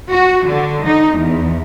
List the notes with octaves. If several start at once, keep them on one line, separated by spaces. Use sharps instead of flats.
F#4
D3
D#4
E2